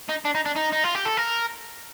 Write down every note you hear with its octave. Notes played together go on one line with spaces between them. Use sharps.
D#4
D4
D#4
D4
D#4
D#4
F4
G4
A4
A#4